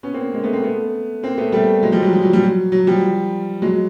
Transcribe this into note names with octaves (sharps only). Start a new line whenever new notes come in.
B3 C#4
A#3 C4
G#3 A#3
A3 B3
A#3 C4
A3 B3
A#3 C4
A3 B3
G3 A3
F#3 G#3
F3 G3
F#3
F3
F#3
F3 G3
F#3
F#3
F3 G3
F#3 G#3